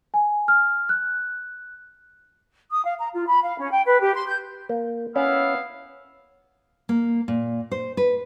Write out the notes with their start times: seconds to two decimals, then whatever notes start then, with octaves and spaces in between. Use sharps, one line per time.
0.14 G#5
0.48 F6
0.89 F#6
2.71 D#6
2.84 F5
2.99 A#5
3.13 F4
3.26 B5
3.43 F5
3.58 C#4
3.72 G5
3.86 B4
4.01 G4
4.15 C6
4.27 G6
4.69 A#3
5.16 B3 C#4 E4 F5
6.89 A#3
7.28 A#2
7.72 C5
7.97 B4